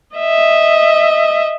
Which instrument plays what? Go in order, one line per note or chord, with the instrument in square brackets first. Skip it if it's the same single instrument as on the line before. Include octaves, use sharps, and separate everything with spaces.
[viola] D#5 E5